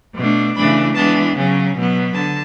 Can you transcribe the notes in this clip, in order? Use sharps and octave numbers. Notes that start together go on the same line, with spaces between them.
B2 A3 D4
C#3 E3 A3 D4 B5
E3 G#3 B3 D4 A5
C#3 F#3 C#4
B2 F#3 B3
D3 A5